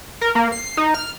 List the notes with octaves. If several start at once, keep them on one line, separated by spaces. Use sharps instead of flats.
A#4
A#3
C7
D#4
F6